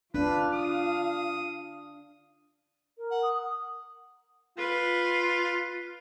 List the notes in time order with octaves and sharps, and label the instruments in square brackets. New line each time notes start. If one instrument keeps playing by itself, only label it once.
[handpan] D4 [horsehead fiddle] F4 F5 [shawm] B4
[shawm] D#6
[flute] A#4
[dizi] F#5
[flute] D#6
[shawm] F4 [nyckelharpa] B4